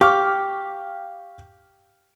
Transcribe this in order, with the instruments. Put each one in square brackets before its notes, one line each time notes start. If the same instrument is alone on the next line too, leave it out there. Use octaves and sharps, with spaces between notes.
[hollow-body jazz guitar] G4 [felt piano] F5 C#6 F6 [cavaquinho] D6